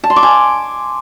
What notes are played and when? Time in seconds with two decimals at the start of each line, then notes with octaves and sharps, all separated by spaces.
0.04 A5
0.10 C6
0.16 D6
0.23 G#5